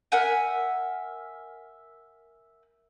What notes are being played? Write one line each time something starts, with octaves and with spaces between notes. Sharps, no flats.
A#4 E5 F#5 G#5